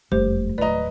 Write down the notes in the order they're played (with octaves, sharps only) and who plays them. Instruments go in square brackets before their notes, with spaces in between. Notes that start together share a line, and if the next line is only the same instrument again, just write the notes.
[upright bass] F#1 F2 [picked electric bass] G3 A3 [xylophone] G4 C5
[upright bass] D1 D#2 [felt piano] B4 D#5 [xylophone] D5 A#5